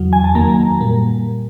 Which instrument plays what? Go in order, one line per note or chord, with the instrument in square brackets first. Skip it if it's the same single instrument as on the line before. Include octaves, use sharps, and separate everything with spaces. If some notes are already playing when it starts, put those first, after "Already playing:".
Already playing: [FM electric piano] E2 C#3 F#3
G#5
A5
F#2 D#3 F#3 A#3 A#5
A#2 G3 A#3